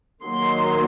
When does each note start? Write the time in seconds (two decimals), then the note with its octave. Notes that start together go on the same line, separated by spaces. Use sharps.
0.24 D#3 F#3 A#3 C6